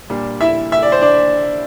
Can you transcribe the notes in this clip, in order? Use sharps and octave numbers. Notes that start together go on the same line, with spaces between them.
A#2 G3 D4
E4 E5
E5
D5
C5
D4 D5